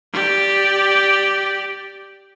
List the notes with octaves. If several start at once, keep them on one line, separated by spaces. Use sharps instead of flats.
G4 D5